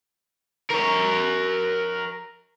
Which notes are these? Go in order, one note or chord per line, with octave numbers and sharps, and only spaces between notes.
A#4 C#5